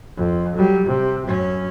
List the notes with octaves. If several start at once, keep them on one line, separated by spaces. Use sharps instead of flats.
F2
F#3 G3
C3
F#2 C#4